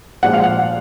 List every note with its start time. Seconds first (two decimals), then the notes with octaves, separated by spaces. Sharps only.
0.23 A#2 F3 G#3 F#5
0.33 F5
0.43 F#5